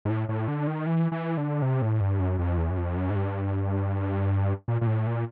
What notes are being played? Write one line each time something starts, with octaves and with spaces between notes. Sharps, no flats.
G#2
A2
A2
D3
D#3
E3
E3
D3
C3
A2
G2
F#2
F2
E2
F#2
F2
F#2
G#2
G2
A#2
A#2
A2
A#2